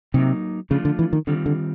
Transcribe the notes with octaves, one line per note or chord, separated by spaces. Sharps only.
C3 F#3 A#3 D#4
C#3 F3 A3 D4 F4
D3
E3
D#3
D3 D#3 G3 C4 F4
D3